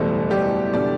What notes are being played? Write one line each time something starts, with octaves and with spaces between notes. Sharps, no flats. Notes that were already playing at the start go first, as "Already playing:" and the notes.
Already playing: F#1 E2 B2 G3 A3 A4
G3 G4
B2 G3 D4 D5